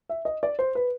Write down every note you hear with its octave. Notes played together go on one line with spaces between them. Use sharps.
E5
D#5
D5
C5
B4